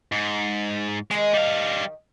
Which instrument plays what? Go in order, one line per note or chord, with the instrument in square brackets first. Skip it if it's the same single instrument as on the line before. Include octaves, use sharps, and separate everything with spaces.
[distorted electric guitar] G#2
[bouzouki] D#3 G4 D#5 [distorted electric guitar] G#3
[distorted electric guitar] G3 F5